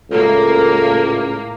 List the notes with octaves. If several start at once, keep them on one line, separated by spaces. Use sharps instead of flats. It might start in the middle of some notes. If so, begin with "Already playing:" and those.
C#2 A2 A#3 A4